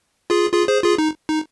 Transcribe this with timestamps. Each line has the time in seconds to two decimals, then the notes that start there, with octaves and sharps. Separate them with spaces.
0.30 F4 G#4
0.53 F4 G#4
0.68 G#4 C5
0.83 F4 G#4
0.98 D#4
1.29 D#4